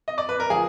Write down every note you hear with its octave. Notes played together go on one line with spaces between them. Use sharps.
D#5
D5
B4
A#4
F3 G#4